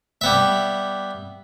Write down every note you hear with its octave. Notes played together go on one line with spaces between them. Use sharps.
G3 B3 E5